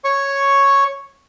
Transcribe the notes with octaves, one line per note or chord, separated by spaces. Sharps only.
C#5 C#6